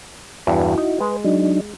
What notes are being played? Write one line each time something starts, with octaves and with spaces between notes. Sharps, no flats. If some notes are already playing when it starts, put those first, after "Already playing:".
E2 G2 E4 F#4
D#4
G#3 B4
F#3 D4 D#4